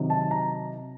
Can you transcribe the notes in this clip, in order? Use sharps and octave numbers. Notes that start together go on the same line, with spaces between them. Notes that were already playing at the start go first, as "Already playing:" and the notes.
Already playing: C3 D#3 F#3
A5
A#5